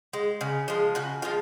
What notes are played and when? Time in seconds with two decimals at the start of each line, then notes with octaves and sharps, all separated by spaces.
0.13 G#3
0.41 C#3
0.68 F3 G#3
0.95 C#3 F#4
1.22 F3 G#3 F4